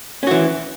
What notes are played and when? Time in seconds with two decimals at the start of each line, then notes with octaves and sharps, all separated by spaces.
0.23 C#4
0.27 F#4
0.31 E3